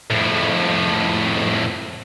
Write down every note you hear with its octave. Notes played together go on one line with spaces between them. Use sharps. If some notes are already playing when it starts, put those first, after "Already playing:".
F2 A2